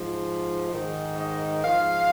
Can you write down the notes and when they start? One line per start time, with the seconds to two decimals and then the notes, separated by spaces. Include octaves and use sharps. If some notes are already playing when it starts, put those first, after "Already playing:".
Already playing: G#2 F3
0.69 G#2 D#3
1.16 D#5
1.64 G#2 F3 F5